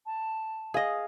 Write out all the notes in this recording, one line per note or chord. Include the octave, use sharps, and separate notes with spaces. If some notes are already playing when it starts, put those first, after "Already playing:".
A5
G#4 D#5 F5